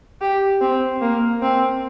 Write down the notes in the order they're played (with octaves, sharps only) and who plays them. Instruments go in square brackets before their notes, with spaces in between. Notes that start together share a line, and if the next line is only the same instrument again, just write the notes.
[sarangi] G4
C4
A#3
C4